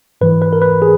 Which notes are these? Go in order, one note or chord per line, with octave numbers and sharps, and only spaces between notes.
G#2 E3 B4
B4
A#4
B4
G#4